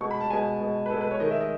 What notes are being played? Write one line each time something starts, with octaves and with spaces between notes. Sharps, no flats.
B2 G#3 C#6
B5
A5
B2 G#3 G#5
B2 G#3
B4
B2 G#3 A4
B4
C#5
D#3 G#3 D#5
E5
D#5